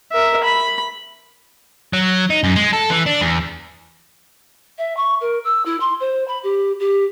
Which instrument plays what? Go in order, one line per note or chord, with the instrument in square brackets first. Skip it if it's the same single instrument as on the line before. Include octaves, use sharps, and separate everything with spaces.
[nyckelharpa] A#4 E5
B5
[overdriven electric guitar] F#3
D#4
F#2
G#3
A4
E3
D4
E2
[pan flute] E5
C#6
A#4
E6
E4
C6
C5
B5
G4
G4